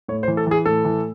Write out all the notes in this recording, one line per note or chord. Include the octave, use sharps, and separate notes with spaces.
A2 C#5
C5
E3
A4
E3 G#4
A2 A4
E3